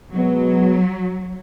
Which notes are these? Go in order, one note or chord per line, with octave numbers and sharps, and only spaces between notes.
B2 F#3 G#3 B3